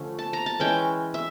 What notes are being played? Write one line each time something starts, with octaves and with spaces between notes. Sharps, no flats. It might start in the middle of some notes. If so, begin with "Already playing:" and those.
Already playing: D3 F3 A3 C#4
A5
A#5
A5
E3 G#3 C#4 G5
E5